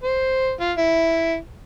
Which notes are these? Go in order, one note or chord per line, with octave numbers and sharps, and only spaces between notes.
C5
F4
E4